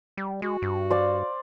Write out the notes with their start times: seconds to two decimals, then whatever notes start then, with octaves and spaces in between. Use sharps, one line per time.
0.17 G3
0.42 G#3 F#4
0.62 G2
0.90 C5 D5 F5